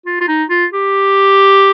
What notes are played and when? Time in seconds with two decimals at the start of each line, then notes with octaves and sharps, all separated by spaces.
0.06 F4
0.21 F4
0.28 D#4
0.50 F4
0.74 G4